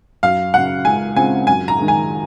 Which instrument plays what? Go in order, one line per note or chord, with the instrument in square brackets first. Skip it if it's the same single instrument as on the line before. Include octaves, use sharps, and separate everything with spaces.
[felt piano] F#2 [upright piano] F5
[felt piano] C#3 F#3 [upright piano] F#5
[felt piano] C#2 [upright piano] G#5
[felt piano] C#3 G#3 C4 F4 [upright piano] G#5
[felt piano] F#2 [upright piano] G#5
[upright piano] A#5
[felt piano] D#3 G#3
[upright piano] G#5